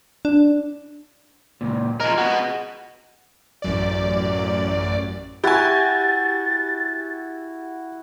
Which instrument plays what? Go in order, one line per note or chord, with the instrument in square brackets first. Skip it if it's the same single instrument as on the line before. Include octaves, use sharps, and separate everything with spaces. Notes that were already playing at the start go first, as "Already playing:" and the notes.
[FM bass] D4
[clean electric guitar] C#2 A#2
[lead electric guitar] F3 A#4 [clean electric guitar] G#4 D#5
[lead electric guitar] B3 F#4
[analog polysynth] A1 F#2 D5
[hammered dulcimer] E4 F#4 [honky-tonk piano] G4 G#5 [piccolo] A6